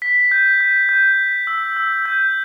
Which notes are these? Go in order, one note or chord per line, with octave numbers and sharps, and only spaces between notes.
B6
G6
G6
G6
B6
E6
E6
G6